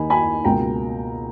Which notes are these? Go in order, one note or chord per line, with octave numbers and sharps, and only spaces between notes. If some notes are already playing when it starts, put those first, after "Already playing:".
Already playing: D#2 D#3 A#3 D#4 G#5 B5
G#5 B5
C#2 B2 A#3 G5 A#5